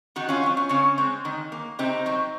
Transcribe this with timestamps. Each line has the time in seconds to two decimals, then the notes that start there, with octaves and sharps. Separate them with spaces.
0.16 D#3 D#4 F#4
0.29 C#4 F4
0.43 F#3 C4
0.57 C#4
0.69 C#3 C#4
0.98 G#3 C4
1.25 D#3
1.52 A#3
1.79 C3 C4 D#4
2.06 F#3 C4